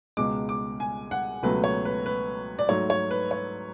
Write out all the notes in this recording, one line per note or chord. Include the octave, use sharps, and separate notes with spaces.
C#2 B2 G#3 D6
D6
G#5
F#5
C#2 B2 F#3 A3 B4
C#5
B4
B4
D5
G#2 F#3 A3 C#5
C#5
B4
C#5